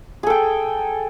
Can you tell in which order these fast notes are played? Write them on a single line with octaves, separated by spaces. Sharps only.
G#4 A4 G5